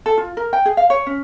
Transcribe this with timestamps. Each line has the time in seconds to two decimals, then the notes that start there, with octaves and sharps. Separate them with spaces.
0.06 A4
0.17 F4
0.37 A#4
0.53 G5
0.65 G#4
0.77 F5
0.90 C#5
1.06 C#4